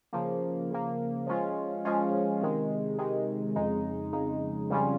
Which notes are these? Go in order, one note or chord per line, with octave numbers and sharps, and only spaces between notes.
C#3 F3 A#3
C#3 F3 A#3
F3 G#3 C#4 F4
F3 G#3 C#4 F4
C3 D#3 G#3
C3 D#3 G#3
F2 C#3 G#3 D#4
F2 C#3 G#3 D#4
F2 C#3 G3 C#4 F4